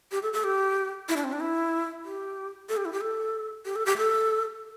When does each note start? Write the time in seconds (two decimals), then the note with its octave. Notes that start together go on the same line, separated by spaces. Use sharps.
0.12 G4
0.23 A4
0.33 A4
0.44 G4
1.09 E4
1.16 D4
1.24 C4
1.33 D4
1.40 E4
2.04 G4
2.69 A4
2.77 G4
2.85 E4
2.93 G4
3.01 A4
3.65 G4
3.76 A4
3.86 G4
3.97 A4